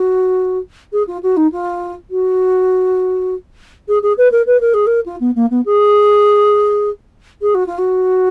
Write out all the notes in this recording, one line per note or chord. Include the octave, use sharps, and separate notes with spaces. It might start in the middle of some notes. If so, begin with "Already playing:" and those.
Already playing: F#4
G#4
F4
F#4
D#4
F4
F#4
G#4
G#4
B4
A#4
B4
A#4
G#4
A#4
F4
B3
A#3
B3
G#4
G#4
F#4
F4
F#4